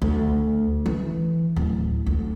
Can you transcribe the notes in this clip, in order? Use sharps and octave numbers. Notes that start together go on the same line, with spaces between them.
D2
E3
D1
D2